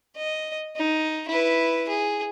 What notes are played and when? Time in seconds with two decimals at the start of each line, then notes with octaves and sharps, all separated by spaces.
0.17 D#5
0.77 D#4
1.28 E4 B4
1.89 G#4